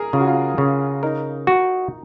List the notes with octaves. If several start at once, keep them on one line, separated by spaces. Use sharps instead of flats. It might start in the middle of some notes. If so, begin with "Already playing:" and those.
Already playing: G#4 A#4
C#3 F4
F#4
F4
C#3
D#4 A#4
F#4